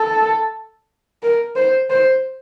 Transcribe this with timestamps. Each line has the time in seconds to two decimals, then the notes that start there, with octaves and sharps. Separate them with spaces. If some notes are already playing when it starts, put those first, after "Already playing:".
Already playing: A4
1.23 A#4
1.56 C5
1.90 C5